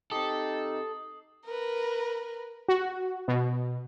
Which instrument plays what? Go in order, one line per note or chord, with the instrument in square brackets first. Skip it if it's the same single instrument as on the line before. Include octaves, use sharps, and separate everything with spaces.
[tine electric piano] C4 G4 [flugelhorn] D#4 [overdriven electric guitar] A4 [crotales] D#6 C7
[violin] A#4 B4
[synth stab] F#4
B2